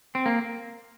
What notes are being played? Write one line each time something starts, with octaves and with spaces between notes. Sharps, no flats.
C4
A#3